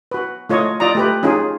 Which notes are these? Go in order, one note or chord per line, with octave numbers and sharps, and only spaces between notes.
F#4 B4
A3 F4 C#5 D#5
F4 D5 D#5 A#5
A3 G4 B4
C#4 D#4 F4 G#4